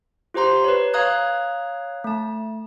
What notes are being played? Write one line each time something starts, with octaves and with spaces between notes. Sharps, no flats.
F4 G4 C5 A#5 C6
B4 C#5
C#5 F5 A#5 D#6 F#6 G#6
A3 A5